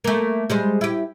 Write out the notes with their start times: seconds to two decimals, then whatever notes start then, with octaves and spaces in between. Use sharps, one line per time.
0.04 A3 A#3
0.50 G3 G#3 C5
0.81 E4 G4